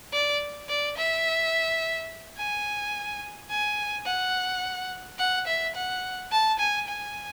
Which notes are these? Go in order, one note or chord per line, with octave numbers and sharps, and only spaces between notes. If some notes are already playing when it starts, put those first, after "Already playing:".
D5
D5
E5
G#5
G#5
F#5
F#5
E5
F#5
A5
G#5
G#5